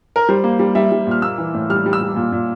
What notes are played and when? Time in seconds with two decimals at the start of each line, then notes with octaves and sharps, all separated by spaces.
0.16 A#4
0.29 G3 C5
0.44 A#3
0.59 G3
0.75 G3 E5
0.92 G3
1.07 A#2 F6
1.22 A#3 E6
1.38 E3
1.54 A2
1.70 G3 F6
1.86 G3
1.93 E6
2.01 G3
2.16 A#2
2.32 A#2